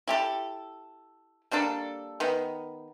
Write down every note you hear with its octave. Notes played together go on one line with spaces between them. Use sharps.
E4 G4 A4
G3 A#3 D4 A4
D#3 B3